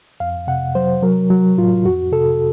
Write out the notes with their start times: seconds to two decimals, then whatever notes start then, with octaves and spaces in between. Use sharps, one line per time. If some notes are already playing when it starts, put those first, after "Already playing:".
0.20 F2 F5
0.47 C3 F#5
0.75 F#3 C5
1.03 F#3 A#4
1.30 F#3
1.57 A2 F4
1.85 F2 F#4
2.12 C3 A4